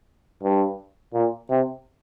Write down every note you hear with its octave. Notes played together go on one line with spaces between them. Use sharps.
G2
A#2
C3